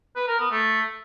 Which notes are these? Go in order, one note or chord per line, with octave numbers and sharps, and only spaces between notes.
B4
A#4
B3
A3